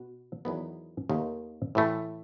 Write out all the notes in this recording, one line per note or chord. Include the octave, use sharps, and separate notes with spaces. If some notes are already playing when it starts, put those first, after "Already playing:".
Already playing: B2 F#4
E2 D#3 F#3 B3
D#2 D#3 A3
A2 E3 A3